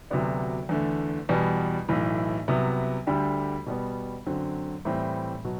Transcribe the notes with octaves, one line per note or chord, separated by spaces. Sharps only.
D2 C3 F#3 B3 D4
E2 D3 A3
E2 B2 G3
B1 A2 E3
C2 C3 F#3 B3
D2 D3 G3 D4 G4
B2 G3 B3
F#2 D3 F#3 C4
A2 E3 G3 C4
B2 F#3